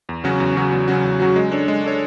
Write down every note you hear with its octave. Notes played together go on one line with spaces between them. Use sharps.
E2
C#3 F#3 C#4 F#4
E2
C#3 F#3 C#4 F#4
E2
C#3 F#3 C#4 F#4
E2
C#3 F#3 C#4 F#4
G#3
D4 A4 C#5
G#3
D4 A4 C#5